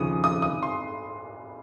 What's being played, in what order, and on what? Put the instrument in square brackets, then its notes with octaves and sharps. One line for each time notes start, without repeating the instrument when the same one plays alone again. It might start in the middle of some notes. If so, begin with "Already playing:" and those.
Already playing: [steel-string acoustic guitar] D#2 C#3 F3 [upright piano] D#6
[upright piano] D#6
D#6
C6